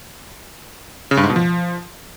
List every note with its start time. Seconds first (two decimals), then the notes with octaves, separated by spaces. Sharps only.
1.11 C#3
1.17 G2
1.23 G#2
1.30 B2
1.36 F3